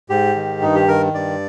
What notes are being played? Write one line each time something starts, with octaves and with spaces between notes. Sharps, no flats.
G#2 G4
D#3
G2 D#4
G4
D#3 A#4
G2 D5